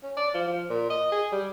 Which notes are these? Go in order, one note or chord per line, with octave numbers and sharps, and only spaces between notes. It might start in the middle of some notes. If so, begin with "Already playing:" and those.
C#4
D5
F3
F3
A#2
D#5
G#4
G3